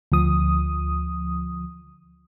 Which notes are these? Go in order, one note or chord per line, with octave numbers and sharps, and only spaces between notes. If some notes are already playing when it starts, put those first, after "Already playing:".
D2 F3 D#6